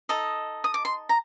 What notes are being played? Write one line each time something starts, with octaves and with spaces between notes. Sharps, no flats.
D#4 A4 D#5
D#6
D6
C6
A#5